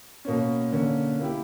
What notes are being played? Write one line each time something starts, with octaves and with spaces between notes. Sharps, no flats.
B2 A#3 C#4
D3 A#3 C#4
A#3 E4 G4